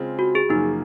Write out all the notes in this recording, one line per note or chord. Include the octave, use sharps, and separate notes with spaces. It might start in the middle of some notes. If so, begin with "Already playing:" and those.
Already playing: C#3 G#3 C4 F4
F#4
G#4
F#2 C#3 F3 A#3 D#4